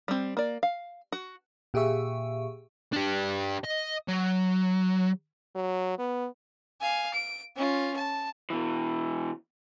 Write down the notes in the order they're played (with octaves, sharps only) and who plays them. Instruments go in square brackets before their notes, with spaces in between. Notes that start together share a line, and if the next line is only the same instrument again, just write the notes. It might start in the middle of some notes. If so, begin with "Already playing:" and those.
[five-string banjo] G3 C4
A#3 D5
F5
F#4
[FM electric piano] A#2 G4 G#4 E5 C#6
[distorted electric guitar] D4 G4
D#5
F#3
[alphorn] F#3
B3
[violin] F5 G#5
D7
C#4 F4
A5
[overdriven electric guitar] B2 E3